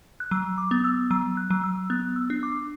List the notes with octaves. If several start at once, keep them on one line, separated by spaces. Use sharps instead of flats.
F#6
F#3 E6
D6
B3
E6
F#3 E6
F#6
F#3
E6
B3 F#6
E6
D4
D6